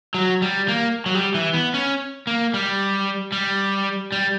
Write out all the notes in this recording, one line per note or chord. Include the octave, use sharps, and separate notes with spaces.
F#3
G3
A#3
F#3
G3
E3
B3
C#4
A#3
G3
G3
G3